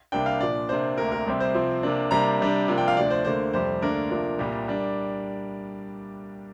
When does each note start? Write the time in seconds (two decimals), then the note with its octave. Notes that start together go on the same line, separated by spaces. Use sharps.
0.12 C2 C3 A#3 D4 G5
0.26 F5
0.40 A#2 F3 D4 D5
0.69 C3 A#3 D4 C5
0.98 D2 C3 A#3 D4 A#4
1.12 A#4
1.26 C2 C3 G3 C4
1.40 C5
1.54 C3 F3 C4
1.83 C3 A#3 D4
2.11 C3 G3 A#3 D4 A#5
2.40 C3 G3 D4
2.68 C3 F3 A#3 D4
2.78 G5
2.88 F5
2.97 D2 C3 F3 D4 D5
3.10 C5
3.25 D2 D3 A#3 C5
3.53 F2 C3 G3 C5
3.82 D2 D3 A#3 D4 A#4
4.10 C3 F3 A#3 D4
4.39 C2 A#2 G3
4.68 G3 D4